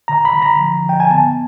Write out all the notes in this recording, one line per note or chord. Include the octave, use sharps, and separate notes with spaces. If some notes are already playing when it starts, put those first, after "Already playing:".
D3 A#5
B5
D3
A#5
F3
F3 G5
G#5
B3 A5